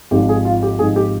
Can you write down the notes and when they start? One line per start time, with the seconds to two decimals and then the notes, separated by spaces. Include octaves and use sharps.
0.11 G#1 G#2 F3 G4
0.29 G#4
0.45 F4
0.63 G4
0.79 G#1 G#2 F3 G#4
0.96 G4